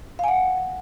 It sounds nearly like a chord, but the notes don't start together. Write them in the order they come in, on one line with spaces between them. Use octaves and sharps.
F5 G#5 F#5